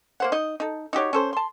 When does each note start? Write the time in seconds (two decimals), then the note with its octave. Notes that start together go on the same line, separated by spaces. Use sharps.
0.20 A#3 C5 F#5
0.32 D#4 D#5
0.60 D#4 A4
0.93 D#4 F#4 G4 C#5
1.13 C#4 A4 C5
1.33 A5 C6